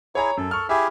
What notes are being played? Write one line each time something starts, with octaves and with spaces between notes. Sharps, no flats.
E4 G#4 C#5 A#5
F#2 A4
C#6 F6
E4 G4 G#4 E5